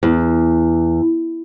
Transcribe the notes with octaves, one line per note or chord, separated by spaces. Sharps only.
E2